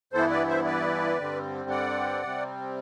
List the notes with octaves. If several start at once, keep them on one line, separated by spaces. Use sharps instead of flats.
G2 E3 B3 E4 A4 C5
B4 D5
C5 E5
B4 D5
G2 D3 G3 C4
D5 F#5
C3 G3 C4